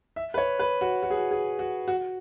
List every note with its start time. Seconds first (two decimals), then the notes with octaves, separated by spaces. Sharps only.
0.16 E5
0.34 B4
0.38 C#5
0.60 B4
0.81 F#4
1.03 F#4
1.10 G#4
1.17 F#4
1.31 G#4
1.59 F#4
1.88 F#4